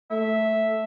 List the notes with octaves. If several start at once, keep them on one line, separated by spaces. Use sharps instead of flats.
A3 E5